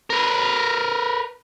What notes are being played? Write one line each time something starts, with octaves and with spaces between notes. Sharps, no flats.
A#4 B4